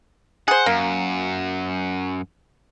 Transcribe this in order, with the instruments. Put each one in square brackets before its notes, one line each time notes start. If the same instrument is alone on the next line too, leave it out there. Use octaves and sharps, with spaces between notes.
[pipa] G#4 C5 [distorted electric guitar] F#5
[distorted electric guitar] F#2 [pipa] A#3